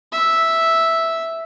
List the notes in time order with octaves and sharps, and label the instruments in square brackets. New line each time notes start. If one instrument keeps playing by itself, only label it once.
[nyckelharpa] E5